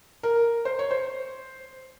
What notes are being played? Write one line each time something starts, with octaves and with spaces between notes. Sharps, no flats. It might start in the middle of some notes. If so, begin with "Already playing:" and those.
A#4
C5
C#5
C5